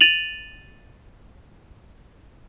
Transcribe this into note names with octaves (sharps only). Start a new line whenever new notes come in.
A6 D#7 F7 F#7